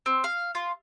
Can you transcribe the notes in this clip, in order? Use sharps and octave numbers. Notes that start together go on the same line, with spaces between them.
C4
F5
F4